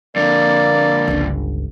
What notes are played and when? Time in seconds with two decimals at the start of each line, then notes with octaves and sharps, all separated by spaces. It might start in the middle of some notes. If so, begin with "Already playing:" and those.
0.16 F2 D3 A#3 D5
1.08 G1 C#2